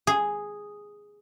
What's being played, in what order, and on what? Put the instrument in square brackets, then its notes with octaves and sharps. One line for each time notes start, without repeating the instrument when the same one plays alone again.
[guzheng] G#4